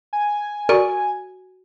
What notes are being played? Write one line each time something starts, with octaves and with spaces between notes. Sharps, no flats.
G#5
F#4 A#4 D5 C#6